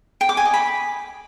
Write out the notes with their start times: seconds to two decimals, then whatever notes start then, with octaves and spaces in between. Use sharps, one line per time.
0.21 G5
0.29 D6
0.37 G#5
0.45 D#5
0.54 B5